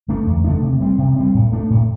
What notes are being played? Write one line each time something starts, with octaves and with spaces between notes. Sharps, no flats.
D3 A3 D4
E2
D3 A3 D4
C3
G3 C4
C3
G3 C4
A2
A3 D4
A2